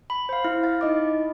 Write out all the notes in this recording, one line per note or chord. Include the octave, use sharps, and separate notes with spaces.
B5
C5 F5
E4 F6
F5 A6
D#4 D#5 D6